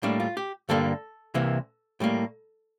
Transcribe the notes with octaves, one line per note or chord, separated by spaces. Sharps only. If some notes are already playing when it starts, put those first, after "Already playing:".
A2 G3 A#3 D4
F4
G4
G2 D3 G3 A#3 A4
C2 C3 E3 A#3
A2 G3 A#3